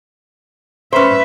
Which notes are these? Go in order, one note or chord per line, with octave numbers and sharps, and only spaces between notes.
C#4 B4 C5 E5